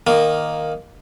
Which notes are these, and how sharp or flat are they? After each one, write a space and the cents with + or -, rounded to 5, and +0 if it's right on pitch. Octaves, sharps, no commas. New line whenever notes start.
D#3 -5 A#3 +0 D#6 -40